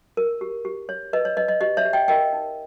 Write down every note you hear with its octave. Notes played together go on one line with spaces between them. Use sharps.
A#4
G4
G4
C#5
B4 D#5
C#5
B4 D#5
D#5
G4 D#5
C#5 E5
G4
D#5 G5
A#4 D#5 G5
D#4